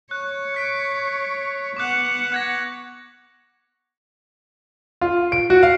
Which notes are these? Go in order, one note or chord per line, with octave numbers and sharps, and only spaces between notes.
C#5 F#6
F#6 B6 D7
B3 F#5 C#6 D6 F#6
F#6 G#6 A#6
F4
D7
F#4
F5